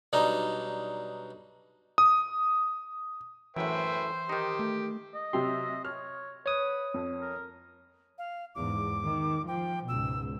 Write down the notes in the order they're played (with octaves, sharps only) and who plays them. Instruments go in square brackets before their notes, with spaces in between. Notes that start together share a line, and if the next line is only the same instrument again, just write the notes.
[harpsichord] B1 G3 D4 D#4
[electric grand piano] D#6
[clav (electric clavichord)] F#2 A2 [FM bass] E3 [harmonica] B4 E5 G5 [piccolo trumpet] C5
[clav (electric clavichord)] D#3 D#4 [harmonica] G4
[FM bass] A3
[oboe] D#5
[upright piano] C3 F#3 G4 [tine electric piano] C6
[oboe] C#5 [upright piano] F6
[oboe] B4 [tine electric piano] C#5 D#6
[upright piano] F2
[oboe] A#4
[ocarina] F5
[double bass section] E2 G#2 [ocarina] D6
[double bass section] D#3
[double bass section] F3 [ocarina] G5
[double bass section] C#2 G#2 B2 [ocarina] E6